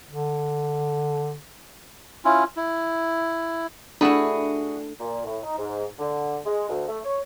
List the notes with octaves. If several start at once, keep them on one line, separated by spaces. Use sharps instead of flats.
D3
C#4 E4 F4
E4
A3 D4 E4 F#4 G#4 B5
A#2
A2
D#4
G#2
D3
G#3
D2
A3
C#5